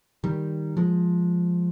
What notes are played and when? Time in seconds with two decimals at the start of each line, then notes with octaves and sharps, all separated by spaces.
0.24 D#3 G3
0.77 F3 G#3